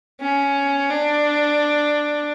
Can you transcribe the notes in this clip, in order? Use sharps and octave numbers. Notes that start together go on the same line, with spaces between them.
C#4
D4